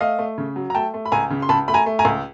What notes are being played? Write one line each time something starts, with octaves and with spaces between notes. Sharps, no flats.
A3 D#5 F5
A3
C#3
F#3
A#5
A3 G5 A5
A3
B5
C#2 G#5 A#5
C#3
C6
C#2 A5 B5
A3 B5
G#5 A#5
A3
G#5 A#5
C#2